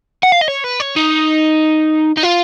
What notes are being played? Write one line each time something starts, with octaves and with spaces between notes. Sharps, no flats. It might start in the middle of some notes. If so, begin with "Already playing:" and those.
F#5
F5
D#5
C#5
B4
C#5
D#4
D#4
F4